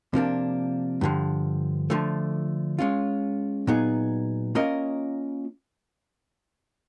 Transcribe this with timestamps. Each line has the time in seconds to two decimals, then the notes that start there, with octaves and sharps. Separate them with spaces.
0.14 C3 F3 A#3 D4
1.01 G2 D3 F3
1.90 D3 F3 A3
2.79 G#3 C#4 F4
3.67 A#2 F#3 B3 D#4 G#4
4.55 A#3 C#4 F4 A#4 D#5